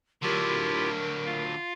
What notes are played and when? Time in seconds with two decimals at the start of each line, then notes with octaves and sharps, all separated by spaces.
0.23 D3 F#3 E4 F4 G4 A#4
1.25 F4 F5